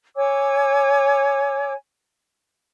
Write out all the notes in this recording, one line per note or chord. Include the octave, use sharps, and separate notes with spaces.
C#5 G#5 D6 E6